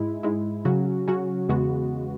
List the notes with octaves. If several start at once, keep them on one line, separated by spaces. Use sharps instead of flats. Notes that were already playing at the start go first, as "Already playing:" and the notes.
Already playing: G#2 G#3 E4
G#2 G#3 E4
C#3 F#3 C#4 F#4
C#3 F#3 C#4 F#4
E2 C#3 G#3 B3 F#4